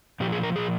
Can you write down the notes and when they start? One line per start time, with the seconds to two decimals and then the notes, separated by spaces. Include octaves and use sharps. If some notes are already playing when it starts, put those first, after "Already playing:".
0.20 A#2 F3 G4
0.32 G#4
0.43 A#4
0.56 A#2 F3 G#4